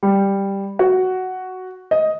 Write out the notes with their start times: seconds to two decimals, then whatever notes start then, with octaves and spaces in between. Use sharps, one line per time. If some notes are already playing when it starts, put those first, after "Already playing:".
0.03 G3
0.79 F#4
1.91 D#5